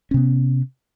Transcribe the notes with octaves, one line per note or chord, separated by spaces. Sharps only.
C3 B3 C#4